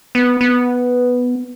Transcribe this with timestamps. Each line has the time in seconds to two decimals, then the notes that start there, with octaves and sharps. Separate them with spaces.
0.15 B3
0.41 B3